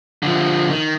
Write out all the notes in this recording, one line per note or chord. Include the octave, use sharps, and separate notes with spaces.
D3 F3
D#3